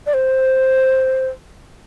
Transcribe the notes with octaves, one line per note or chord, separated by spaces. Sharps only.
D5
C5